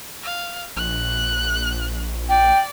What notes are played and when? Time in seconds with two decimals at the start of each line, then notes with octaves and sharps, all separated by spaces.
0.23 F5
0.77 A#1 F#6
2.29 D5 G5